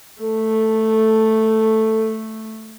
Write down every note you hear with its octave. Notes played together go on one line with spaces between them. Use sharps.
A3 A4